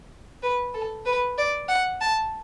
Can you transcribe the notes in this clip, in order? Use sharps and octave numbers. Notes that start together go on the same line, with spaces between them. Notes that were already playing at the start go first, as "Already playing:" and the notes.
B4
A4
B4
D5
F#5
A5